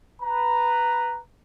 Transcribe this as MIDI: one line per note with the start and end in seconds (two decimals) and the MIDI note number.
0.21 1.18 71
0.21 1.18 82